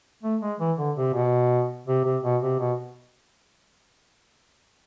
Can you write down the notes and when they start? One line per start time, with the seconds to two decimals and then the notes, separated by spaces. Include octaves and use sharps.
0.23 A3
0.41 G#3
0.59 E3
0.78 D3
0.97 C3
1.14 B2
1.87 C3
2.05 C3
2.24 B2
2.42 C3
2.60 B2